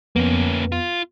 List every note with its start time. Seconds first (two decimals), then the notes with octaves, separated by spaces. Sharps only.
0.16 F2 A#3 B3 C#4
0.72 F4